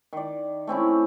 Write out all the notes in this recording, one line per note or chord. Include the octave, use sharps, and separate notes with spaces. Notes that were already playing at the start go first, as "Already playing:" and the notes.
D#3 D5
A3 C4 C#4 E4